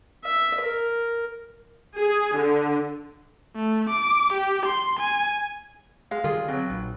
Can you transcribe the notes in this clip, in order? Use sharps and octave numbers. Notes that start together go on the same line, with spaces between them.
E5
A#4
G#4
D3
A3
D6
G4
C6
G#5
G#3 F5
D3 D#3 G3 F4 G#4
B2 F#3 C4
A#1